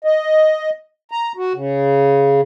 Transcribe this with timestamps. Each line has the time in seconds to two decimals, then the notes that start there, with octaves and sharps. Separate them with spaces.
0.04 D#5
1.11 A#5
1.37 F#4
1.54 C#3